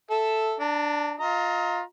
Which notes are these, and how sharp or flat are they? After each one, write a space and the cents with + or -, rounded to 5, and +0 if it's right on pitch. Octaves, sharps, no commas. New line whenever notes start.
A4 +0 E5 +0
D4 +0 A#5 -45
F4 +15 D#5 +35 A#5 +0